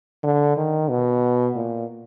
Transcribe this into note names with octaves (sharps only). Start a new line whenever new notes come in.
D3
D#3
B2
A#2